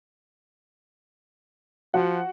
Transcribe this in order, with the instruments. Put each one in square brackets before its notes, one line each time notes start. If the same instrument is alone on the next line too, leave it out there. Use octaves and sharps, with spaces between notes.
[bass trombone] F3 [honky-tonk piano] F#4 F#5